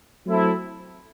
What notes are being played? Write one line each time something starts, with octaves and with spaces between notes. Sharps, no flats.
F#3 A3 C4 E4 A4